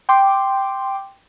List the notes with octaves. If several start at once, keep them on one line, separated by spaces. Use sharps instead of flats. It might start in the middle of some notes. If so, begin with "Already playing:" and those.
G5 C6 D6